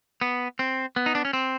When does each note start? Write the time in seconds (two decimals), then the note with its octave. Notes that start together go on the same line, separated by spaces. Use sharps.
0.21 B3
0.59 C4
0.96 B3
1.06 D#4
1.15 D4
1.25 C#4
1.33 C4